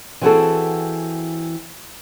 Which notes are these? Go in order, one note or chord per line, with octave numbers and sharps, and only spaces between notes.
E3 C4 F#4 G#4 A4